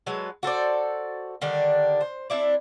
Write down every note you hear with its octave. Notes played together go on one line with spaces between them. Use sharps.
F#3 G#3 A4 B4
F#4 A4 C5 D5
D3 D#3 G3 D4
C5
C4 D4 E4 D5